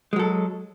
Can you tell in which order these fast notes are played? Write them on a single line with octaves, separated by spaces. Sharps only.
G#3 F#3 A4